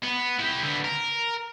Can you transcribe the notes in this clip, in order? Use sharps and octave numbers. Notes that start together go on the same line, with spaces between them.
B3
E4 G4
D3 B3
A#4